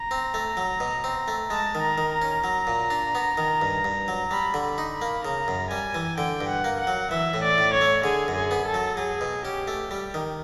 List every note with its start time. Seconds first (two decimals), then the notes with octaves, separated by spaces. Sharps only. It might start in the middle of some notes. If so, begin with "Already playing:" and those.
Already playing: A#5
0.11 C4
0.34 A3
0.57 F#3
0.80 B2
1.04 C4
1.28 A3
1.50 G#3 A5
1.75 D#3
1.82 A#5
1.98 D#3
2.13 A#5
2.22 C#4
2.44 F#3
2.67 A#2
2.90 D4
3.15 B3
3.38 D#3
3.62 G2
3.85 G2
4.08 F#3
4.31 G3 B5
4.54 D3
4.62 B5
4.78 D#4
4.93 B5
5.02 A#3
5.24 C#3 A#5
5.48 F#2
5.71 G3 G#5
5.95 E3
6.18 D3 G5
6.41 G2
6.49 F#5
6.64 A#3
6.80 F#5
6.87 F#3
7.11 E3 E5
7.34 A2
7.43 D5
7.58 A2
7.73 C#5
7.81 A3
8.04 D3 G#4
8.28 F#2
8.35 G#4
8.51 B3
8.66 A4
8.74 F#3
8.97 F#3 G#4
9.21 B2
9.45 C#4 G4
9.68 A3
9.91 G3 G4
10.14 D#3